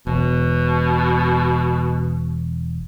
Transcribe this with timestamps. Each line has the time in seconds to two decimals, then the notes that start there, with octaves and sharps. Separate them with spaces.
0.07 E1 B2